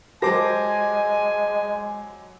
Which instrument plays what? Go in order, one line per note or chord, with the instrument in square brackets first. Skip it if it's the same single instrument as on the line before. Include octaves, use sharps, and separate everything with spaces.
[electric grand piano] F#3 D6 A#6 [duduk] G#3 [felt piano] G4 C5 A5 [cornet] G#5